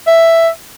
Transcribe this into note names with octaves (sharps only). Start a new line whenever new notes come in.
E5